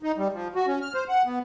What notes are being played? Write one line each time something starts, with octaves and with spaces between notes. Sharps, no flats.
D#4
G3
F3
F#4
C#4
F6
C5
F#5
B3